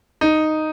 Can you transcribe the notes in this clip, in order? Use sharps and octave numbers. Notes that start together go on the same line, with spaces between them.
D#4